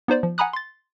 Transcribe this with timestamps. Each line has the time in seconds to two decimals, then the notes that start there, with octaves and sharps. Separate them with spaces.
0.08 B3 D#4 C5 D5
0.23 F3
0.38 F#5 G#5 A#5 B5 D#6 F#6
0.53 C6 A6